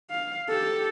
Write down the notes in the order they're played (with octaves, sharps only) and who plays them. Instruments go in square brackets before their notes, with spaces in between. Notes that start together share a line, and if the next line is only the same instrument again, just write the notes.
[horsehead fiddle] F5
G4 A4